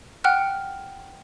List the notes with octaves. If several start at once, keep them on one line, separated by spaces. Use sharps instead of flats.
F#5 G5 F6 F#6